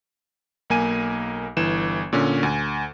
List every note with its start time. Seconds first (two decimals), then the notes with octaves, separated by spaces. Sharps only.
0.70 B1 A#3 G#5 D#7
1.57 G1 E3 E7
2.13 A#2 D3 C#4
2.43 D2 G#5